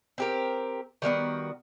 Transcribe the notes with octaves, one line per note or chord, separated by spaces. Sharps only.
C4 G4 A#4
D#3 G3 B3 F#4